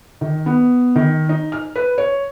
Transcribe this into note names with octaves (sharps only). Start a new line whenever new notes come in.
D#3
B3
D#3
D#4
F6
B4
C#5